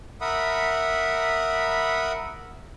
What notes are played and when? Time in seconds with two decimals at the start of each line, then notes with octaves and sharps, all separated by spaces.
0.21 A#4 E5 F#5 B5 D#6